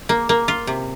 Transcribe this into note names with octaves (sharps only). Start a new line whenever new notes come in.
A#3
A#3
F4
C3